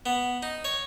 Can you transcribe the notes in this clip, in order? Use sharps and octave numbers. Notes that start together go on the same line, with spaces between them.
B3
D#4
C#5